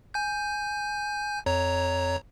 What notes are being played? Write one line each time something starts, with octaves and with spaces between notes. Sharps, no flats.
G#5 G6
F2 C#5 A#5